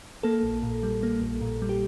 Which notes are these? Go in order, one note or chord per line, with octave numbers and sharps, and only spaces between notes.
A#3 A4
A#1
A#2
G3
A#3
A#1
A#2
G3
G4